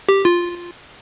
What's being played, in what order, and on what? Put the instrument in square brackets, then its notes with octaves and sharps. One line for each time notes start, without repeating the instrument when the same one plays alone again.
[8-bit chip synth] G4
F4